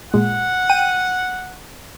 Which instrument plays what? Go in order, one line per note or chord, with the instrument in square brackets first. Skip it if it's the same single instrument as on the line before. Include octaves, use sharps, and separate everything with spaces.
[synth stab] A#2 G#3 [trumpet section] F#5
[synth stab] G5 D#7